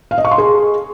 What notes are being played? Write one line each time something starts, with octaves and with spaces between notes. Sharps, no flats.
F5
D#5
C#6
C6
G#4